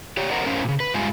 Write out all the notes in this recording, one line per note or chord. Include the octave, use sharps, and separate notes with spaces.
G4 C#5 D5
A4 A#4 C5 D#5 F#5 A#5
F#2 C#4 A#4 C5 F5
A#2 C#3
B4
G#2 G3 G#3 F4 F5 G#5